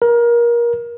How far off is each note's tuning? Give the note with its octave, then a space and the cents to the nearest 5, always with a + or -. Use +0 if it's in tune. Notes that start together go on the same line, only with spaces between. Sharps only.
A#4 +25